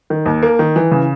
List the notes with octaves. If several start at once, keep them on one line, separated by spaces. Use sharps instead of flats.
D#3
D#2
A#3
D#3
E3
C#3